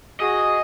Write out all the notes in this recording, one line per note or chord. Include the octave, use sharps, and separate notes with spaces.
F#4 G#4 D#5